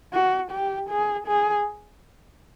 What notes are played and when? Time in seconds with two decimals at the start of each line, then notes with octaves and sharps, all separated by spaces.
0.13 F#4
0.52 G4
0.90 G#4
1.27 G#4